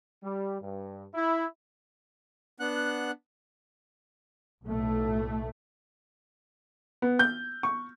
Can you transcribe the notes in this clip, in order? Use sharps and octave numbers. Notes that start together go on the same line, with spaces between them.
G3
G2
E4
B3 D4 F#5 F#6
B1 A2 A3
B3
G6
C#6